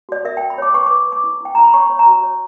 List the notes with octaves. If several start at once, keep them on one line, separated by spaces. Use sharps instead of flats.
F#4 D5
A#4 E5
G5
F#4
B5
C#5 D6
B4 C#6
D6
B4
B4 D6
E4
E4 G5
E4 A#5
B5
C#5 C#6
C#5 B5
A#5
F#4
A#5
C#5